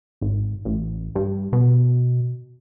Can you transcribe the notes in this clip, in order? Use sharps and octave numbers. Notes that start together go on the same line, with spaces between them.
G#1
A1
G2
B2